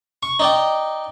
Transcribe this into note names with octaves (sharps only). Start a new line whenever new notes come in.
C#6
D#4 D5 G5